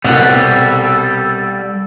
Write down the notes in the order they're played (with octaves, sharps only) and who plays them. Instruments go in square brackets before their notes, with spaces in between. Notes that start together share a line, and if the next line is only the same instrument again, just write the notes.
[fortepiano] C2 B2 [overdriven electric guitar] G3 F#5 [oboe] A4